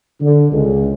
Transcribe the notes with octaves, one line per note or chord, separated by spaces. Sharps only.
D3
C#2